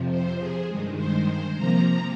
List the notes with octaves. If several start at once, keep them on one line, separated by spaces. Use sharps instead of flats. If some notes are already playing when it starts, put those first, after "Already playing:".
Already playing: F2 C3 F3
C5
G#4
G2 D#3 G#3
C5
C5
C3 F3 A#3 A#5